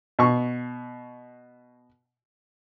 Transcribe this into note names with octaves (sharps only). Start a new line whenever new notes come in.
B2 C#6